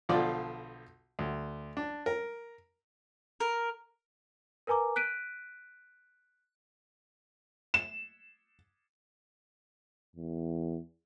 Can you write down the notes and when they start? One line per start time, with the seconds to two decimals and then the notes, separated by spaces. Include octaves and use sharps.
0.09 B1 D3 F3 F4 D5
1.19 D2
1.77 D4
2.06 A#4
3.40 A#4
4.67 A#4 B4 G#5 A#5 D6
4.96 F#6 B6 D7 D#7
7.74 E7
10.16 E2